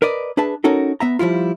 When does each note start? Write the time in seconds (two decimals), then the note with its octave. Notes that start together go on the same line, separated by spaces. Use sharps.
0.02 A#4 B4 D5 D#5
0.37 D4 G#4 B4 E5 A5
0.64 C#4 D#4 F#4 A4 A#4
1.00 B3 E5 A#5
1.19 F3 G3 E4 F4